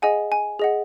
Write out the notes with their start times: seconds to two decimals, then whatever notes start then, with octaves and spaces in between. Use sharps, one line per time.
0.02 G#4 D#5 F#5 G#5
0.32 G#5
0.59 G#4 D#5 F#5